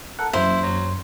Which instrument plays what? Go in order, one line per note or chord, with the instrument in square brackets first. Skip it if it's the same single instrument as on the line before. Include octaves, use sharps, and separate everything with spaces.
[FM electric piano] A4 A#4 F#5
[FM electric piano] F#2 E3 A#3 [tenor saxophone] E4 [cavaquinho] C5
[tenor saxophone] F#3